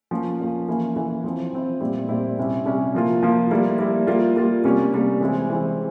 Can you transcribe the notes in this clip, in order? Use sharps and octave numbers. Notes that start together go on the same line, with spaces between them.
F3 A#3 C#4
F3 A#3 C#4
E3 A#3 C#4 E4
E3 A#3 C#4 E4
F3 C4 E4
F3 C4 E4
A#2 G3 C4 E4
A#2 G3 C4 E4
C3 G3 C#4 E4
C3 G3 C#4 E4
F3 A#3 F4
F3 A#3 F4
G3 A#3 E4
G3 A#3 E4
G3 A#3 F4
G3 A#3 F4
C3 G3 A#3 C#4
C3 G3 A#3 C#4
E3 G#3 C4 E4
E3 G#3 C4 E4